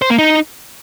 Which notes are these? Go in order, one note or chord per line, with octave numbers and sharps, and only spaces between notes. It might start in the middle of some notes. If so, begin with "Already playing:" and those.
C5
A#3
D#4